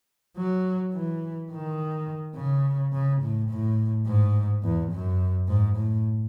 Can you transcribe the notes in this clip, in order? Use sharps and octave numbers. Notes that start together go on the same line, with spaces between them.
F#3
E3
D#3
C#3
C#3
A2
A2
G#2
E2
F#2
G#2
A2